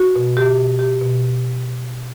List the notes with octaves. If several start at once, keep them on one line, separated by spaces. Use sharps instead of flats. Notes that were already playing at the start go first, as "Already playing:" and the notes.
Already playing: F#4
B2
B2 G4
B2
B2 G4
B2